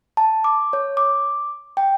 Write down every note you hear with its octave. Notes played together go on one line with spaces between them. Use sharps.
A5
D6
C#5
D6
G5